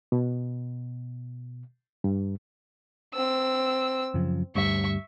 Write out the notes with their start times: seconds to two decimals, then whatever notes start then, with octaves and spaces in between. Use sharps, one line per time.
0.12 B2
2.04 G2
3.14 C4 E6
4.14 F#2 C#3 F3
4.55 D2 G2 G3 E5 C#6